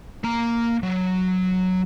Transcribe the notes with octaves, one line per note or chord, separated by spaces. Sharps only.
A#3 A#5
F#3